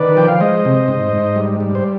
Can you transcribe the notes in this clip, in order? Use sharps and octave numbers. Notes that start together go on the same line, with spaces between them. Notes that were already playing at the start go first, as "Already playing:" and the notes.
Already playing: D#3 B4 D5
F3 G5
F5
G#3 C5 D#5
C3
G#2
G#2
G3
G3
C5